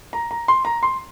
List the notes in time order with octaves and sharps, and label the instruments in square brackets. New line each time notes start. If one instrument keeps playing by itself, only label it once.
[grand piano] A#5
A#5
C6
A#5
C6